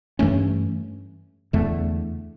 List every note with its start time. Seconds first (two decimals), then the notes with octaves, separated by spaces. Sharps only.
0.19 G2 E3 A3 C#4
1.53 E2 D3 A3